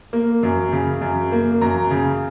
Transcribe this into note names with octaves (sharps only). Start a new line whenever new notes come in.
A#3
F#2
C#3
F#2
A#3
F#2 A#5
C#3